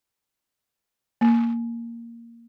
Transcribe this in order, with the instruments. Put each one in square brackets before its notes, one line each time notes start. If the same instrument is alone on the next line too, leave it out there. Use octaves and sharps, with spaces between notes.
[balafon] A#3